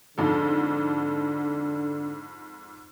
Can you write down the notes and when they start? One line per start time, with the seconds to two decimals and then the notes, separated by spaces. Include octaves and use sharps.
0.18 F2 G#2 D3 A4